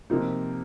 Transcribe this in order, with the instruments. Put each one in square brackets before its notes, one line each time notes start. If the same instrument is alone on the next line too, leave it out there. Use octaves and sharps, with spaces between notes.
[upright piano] C3 F3 A#3 D#4